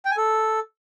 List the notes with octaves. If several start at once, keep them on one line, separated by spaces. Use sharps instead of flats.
G5
G#5
A4